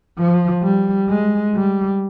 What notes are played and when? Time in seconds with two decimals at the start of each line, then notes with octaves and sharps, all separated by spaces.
0.18 F3
0.63 G3
1.09 G#3
1.55 G3